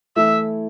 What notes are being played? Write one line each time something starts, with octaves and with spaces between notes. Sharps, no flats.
E3 A3 E4 E5